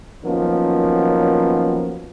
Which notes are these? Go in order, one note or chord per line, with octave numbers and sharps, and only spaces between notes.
D#3 F3 F#3 A#3 B3 C#4